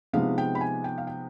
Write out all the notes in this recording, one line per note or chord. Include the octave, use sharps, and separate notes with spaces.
C3 F3 G#3 B3 D#4 F5
G5
B5
G#5
G5
F5
G5